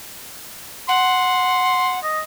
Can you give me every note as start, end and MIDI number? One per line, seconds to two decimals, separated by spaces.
0.89 2.00 78
0.89 1.98 84
2.04 2.21 75